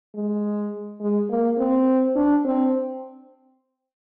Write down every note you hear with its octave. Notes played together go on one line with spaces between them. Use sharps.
G#3
G#3
A#3
C4
D4
C4